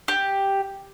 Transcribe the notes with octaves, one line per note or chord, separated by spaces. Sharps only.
G4